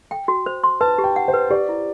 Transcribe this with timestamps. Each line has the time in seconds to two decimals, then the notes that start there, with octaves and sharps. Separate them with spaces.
0.11 G5
0.28 F#4
0.46 C5
0.64 C6
0.81 B4 A5
0.98 G4
1.04 G5
1.16 F#5
1.28 C5
1.33 B4
1.50 G4 D5
1.69 E4